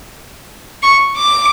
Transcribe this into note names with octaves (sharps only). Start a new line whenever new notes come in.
C#6
D6